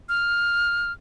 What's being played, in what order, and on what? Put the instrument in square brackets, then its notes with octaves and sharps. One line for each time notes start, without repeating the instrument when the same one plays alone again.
[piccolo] F6